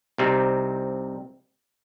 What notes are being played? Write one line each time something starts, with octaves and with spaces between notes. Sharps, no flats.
C2 C3 G3 C4 D#4